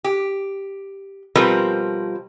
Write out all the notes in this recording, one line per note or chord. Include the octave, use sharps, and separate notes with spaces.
G4
B2 F3 G3 C4 A#4 B4